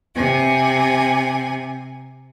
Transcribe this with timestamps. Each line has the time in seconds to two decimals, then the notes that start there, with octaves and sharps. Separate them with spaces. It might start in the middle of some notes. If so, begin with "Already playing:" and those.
0.14 C3 G#5